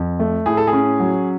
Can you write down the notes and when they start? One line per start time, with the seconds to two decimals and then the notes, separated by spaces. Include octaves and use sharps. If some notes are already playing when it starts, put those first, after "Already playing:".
Already playing: F2
0.20 A3
0.46 A2 G#4
0.57 A4
0.67 G#4
0.73 C#4
1.00 F#3